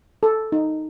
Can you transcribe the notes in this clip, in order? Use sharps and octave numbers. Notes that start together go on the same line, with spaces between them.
A4
D#4